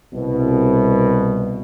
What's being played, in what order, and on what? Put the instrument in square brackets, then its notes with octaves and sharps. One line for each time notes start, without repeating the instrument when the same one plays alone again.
[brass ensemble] C2 B2